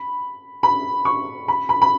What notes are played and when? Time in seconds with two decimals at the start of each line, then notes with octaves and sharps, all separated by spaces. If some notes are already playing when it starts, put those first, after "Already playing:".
Already playing: B5
0.63 B5
1.05 C#6
1.48 B5
1.69 B5
1.82 B5